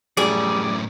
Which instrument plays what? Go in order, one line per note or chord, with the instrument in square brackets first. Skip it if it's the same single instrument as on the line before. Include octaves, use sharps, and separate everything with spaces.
[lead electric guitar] F#2 A2 [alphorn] G3 [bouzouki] G#4 [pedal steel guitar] D5